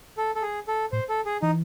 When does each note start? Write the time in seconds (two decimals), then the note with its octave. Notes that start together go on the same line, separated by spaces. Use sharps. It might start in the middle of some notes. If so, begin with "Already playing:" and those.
0.17 A4
0.35 A4
0.42 G#4
0.68 A4
0.92 A2 C5
1.09 A4
1.25 G#4
1.42 E3 D#4